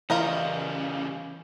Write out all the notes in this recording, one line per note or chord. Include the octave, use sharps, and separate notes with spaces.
C#3 E3 G3 F4 A#4 D#5